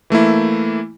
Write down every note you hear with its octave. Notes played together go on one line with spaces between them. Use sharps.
E3 A3 A#3 E4